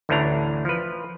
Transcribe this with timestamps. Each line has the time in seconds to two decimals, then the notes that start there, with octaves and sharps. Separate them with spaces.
0.09 A1 D2 A2 E3 D4 A#5
0.65 F3 B4